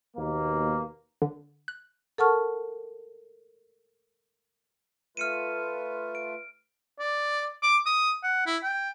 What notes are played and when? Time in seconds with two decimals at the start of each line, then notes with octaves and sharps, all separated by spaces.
0.17 D#2 B2 A#3
1.22 D3
1.68 F#6
2.18 A4 A#4 F#5 A5 C#6 F6
5.17 A3 F4 B4 F6 C#7 D#7
6.15 D7
6.99 D5
7.63 D6
7.86 D#6
8.23 F#5
8.46 E4
8.63 G5